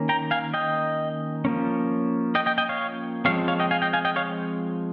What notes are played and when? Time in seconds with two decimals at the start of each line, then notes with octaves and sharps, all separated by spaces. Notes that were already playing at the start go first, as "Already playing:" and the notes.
Already playing: D#3 A#3 C#4
0.09 G5 A#5
0.31 F5 G#5
0.54 D#5 G5
1.45 F3 A#3 C#4
2.35 D#5 G5
2.46 D#5 G5
2.58 D#5 G5
2.69 C#5 F5
3.25 F3 G#3 C4 C#5 F5
3.48 C#5 F5
3.60 D#5 G5
3.71 F5 G#5
3.82 D#5 G5
3.93 F5 G#5
4.05 D#5 G5
4.16 C#5 F5